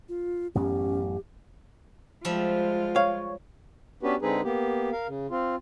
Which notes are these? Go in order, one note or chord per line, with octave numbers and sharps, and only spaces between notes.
F4
A1 F#2 B3 C#4 G4
F3 G3 G#3 F4 E5
C#5 F5
B3 C#4 D4 F#4 G4 B4
D3 G#3 C4 D#4 G#4 B4
A#3 B3 G4
A#4 F5
C#3
C4 F4